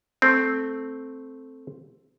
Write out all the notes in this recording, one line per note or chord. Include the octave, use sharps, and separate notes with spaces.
A3 C4